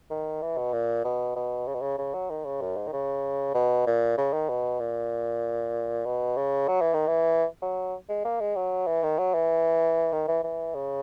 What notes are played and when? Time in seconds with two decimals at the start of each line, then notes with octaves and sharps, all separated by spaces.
0.10 D#3
0.42 E3
0.57 B2
0.73 A#2
1.05 B2
1.36 B2
1.67 C#3
1.74 B2
1.81 C#3
1.98 C#3
2.14 F#3
2.30 D#3
2.45 C#3
2.61 F#2
2.77 G#2
2.87 D#3
2.93 C#3
3.54 B2
3.87 A#2
4.18 C#3
4.33 D#3
4.49 B2
4.80 A#2
6.05 B2
6.37 C#3
6.68 F#3
6.81 E3
6.94 D#3
7.07 E3
7.62 F#3
8.09 G#3
8.25 A#3
8.40 G#3
8.56 F#3
8.87 E3
9.03 D#3
9.19 F#3
9.34 E3
10.12 D#3
10.28 E3
10.44 E3
10.75 C#3